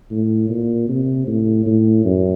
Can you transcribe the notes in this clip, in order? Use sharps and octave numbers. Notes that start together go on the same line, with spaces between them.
A2
A#2
C3
A2
A2
F#2